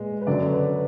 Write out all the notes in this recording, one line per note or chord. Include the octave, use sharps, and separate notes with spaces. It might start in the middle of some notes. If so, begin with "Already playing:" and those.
Already playing: A#2 G#3 B4
B4
F#2 D3 F#3 D5
B4